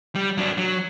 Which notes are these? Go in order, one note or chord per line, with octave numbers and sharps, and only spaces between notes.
G3
F#3 D4
F#3